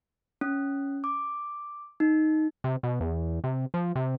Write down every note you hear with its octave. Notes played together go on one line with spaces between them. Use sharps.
C#4
D6
D#4
C3
B2
E2
C3
F3
C3